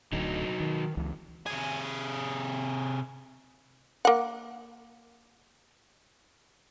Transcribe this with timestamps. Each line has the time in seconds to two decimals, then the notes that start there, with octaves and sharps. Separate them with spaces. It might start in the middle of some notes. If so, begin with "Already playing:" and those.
0.12 D1 D2 F#3 D#4
0.60 D#3
0.97 C#2 E3
1.46 C3 G#4
4.05 A#3 F#5